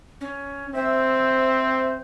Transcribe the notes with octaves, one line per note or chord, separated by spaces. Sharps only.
C#4
C4 C5 E5